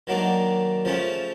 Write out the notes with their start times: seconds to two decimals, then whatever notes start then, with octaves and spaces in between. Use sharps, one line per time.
0.07 D#3 F#3 A#3 D4
0.85 C#3 F3 A3 C#4